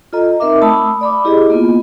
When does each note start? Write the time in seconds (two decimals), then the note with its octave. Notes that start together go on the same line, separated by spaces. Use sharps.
0.13 F4 A4 D#5 A#5
0.40 C4 D#4 A#4 E5 D6
0.62 A3 A5 B5 D#6 E6
1.01 D5 B5 D6
1.25 E4 G4 G#4 D#5
1.50 A#3 B3 F4